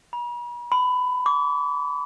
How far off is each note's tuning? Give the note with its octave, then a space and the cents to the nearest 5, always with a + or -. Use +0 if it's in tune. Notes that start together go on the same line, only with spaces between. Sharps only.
B5 -45
B5 +20
D6 -40